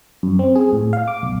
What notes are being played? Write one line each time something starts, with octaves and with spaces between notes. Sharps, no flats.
F#2
C4
G#4
A2
F5
D6
B1